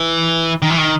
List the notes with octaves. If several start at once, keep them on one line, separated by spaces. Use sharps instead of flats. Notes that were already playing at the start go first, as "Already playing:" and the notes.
Already playing: E3
D#3
E3
D#3